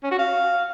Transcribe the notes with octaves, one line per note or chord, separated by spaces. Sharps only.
C#4
F#4
F5